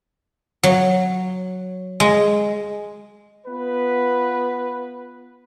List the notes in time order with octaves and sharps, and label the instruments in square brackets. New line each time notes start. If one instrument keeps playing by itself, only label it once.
[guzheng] F#3
G#3
[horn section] B3 F4 B4